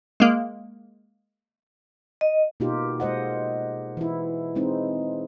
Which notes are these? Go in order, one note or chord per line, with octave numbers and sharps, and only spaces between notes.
G#3 A#3
D#5
B2 A#3 D#4 F4 G4
G#3 C5 D#5 F#5
E3 E4
G#3 C4 D#4